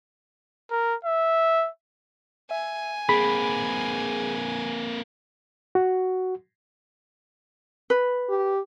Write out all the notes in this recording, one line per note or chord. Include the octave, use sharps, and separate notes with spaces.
A#4
E5
E5 G#5
A#3 C4 G#4 B5
F#4
B4
G4